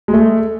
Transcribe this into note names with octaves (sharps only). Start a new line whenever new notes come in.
G#3
A3